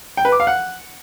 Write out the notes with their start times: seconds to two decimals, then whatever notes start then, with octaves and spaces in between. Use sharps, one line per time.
0.17 G5
0.25 B4
0.32 D6
0.40 F5
0.47 F#5